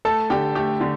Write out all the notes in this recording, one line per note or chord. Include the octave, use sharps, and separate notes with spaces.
A3 A4 A5
D3 G4 G5
A3 G4 G5
D3